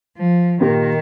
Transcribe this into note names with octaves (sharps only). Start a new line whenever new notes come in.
F3
A#2 D#3 A#3 G4 A#4